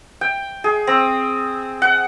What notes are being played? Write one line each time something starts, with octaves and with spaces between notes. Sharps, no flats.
G5
G#4
C4
F#5